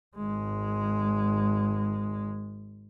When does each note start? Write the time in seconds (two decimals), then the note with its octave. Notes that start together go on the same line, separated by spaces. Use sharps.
0.17 G#1 G#3